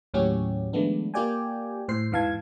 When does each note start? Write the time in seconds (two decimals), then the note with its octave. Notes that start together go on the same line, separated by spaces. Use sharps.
0.14 D#2 A2 F#3 C#4 F#4 G4
0.73 D#3 F3 G#3 A3 B3 D4
1.14 A#3 F4 G4 D5 G5 G#5
1.88 A2 C5 C7
2.11 E2 G#2 E3 F5 A5 G#6